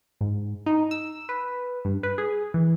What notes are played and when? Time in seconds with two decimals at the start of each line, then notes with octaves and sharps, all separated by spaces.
0.21 G#2
0.66 D#4
0.91 E6
1.29 B4
1.85 G2
2.03 B4
2.18 G#4
2.54 E3